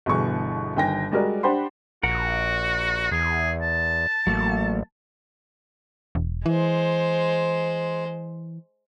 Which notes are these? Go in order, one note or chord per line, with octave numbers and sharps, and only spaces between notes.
G1 B2 E3 G#4 C#6
G1 D#3 G5 G#5 A#6
G3 G#3 F#4 A#4 D5
D4 G4 C5 F#5 B5 C6
A#1 F#4 A#4 F#5
E2 G#4
A5
A1 F#3 A3 A#3
E1
E3 G#3 C5